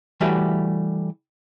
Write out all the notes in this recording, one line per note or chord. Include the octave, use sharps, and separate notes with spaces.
E3 G3 A3 F#4 G4 B4